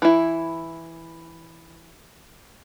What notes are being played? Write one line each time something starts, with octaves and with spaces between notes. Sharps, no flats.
E3 E4